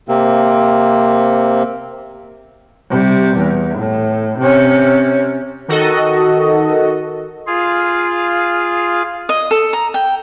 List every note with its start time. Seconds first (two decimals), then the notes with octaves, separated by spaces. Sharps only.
0.08 C3 A#3 C4
2.90 C3 G3
3.37 E2
3.78 A2
4.38 C3 C#4
5.68 D#3 F#4 A4 D#5
7.47 F4 G#4 F5
9.29 D#5
9.51 A4
9.73 A#5
9.94 G5